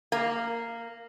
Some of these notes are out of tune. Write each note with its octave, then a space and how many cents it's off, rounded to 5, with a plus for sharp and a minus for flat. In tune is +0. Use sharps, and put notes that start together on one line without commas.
A#3 -10